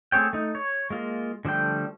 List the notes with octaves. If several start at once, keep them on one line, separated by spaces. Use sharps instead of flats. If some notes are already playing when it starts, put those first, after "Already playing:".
A3 C4 G#4 C#5 G5
A3 D#4
C#5
G#3 A#3 F4
D3 F3 G3 A3 G5